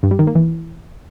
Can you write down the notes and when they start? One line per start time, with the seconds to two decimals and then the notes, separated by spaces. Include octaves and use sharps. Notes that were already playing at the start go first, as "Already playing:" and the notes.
0.03 G2
0.11 G3
0.19 D#3
0.27 A#3
0.35 E3